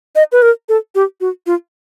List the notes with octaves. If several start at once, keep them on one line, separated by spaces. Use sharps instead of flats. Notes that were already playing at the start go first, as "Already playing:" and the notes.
D#5
B4
A#4
A4
G4
F#4
F4